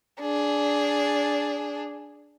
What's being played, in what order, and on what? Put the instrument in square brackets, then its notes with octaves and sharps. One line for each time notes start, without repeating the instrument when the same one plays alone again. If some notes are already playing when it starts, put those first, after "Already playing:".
[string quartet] D4 G#4